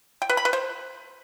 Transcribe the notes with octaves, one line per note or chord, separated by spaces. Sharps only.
G5
B4
B5
B4
C5